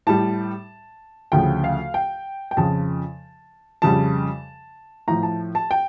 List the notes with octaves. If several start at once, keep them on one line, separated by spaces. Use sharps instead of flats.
A2 G3 A5
D2 C#3 F3 G5
F5
G5
G5
F2 C#3 F3 A5
F2 C#3 G3 A5
A2 F3 A#5
A5
A5
G5